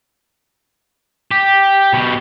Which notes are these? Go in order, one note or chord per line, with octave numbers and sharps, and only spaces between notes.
G4
B2 G4